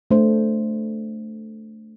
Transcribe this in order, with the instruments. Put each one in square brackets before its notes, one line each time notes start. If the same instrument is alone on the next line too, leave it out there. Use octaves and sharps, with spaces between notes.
[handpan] A3 D4 A4 C5